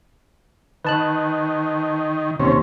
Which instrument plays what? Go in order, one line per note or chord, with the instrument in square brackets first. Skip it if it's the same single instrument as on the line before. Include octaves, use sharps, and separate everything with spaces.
[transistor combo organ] D#3 [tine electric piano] B4 A5 F#6
[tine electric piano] D#2 [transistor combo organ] C3 C#4